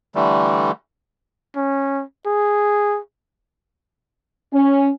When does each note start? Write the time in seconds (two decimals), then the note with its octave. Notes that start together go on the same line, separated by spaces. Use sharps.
0.15 D3 E3 G3 A3
1.56 C#4
2.26 G#4
4.53 C#4